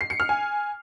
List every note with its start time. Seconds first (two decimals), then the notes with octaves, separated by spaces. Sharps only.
0.01 C7
0.10 C#7
0.20 F6
0.29 G#5